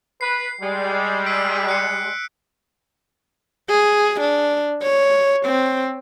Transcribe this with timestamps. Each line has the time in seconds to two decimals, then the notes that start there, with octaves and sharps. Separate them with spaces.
0.21 B4 C7
0.61 G3 G#3
1.26 E6 B6 D7
1.68 F#6 C7 C#7
3.69 G#4
4.20 D4
4.83 C#5
5.46 C4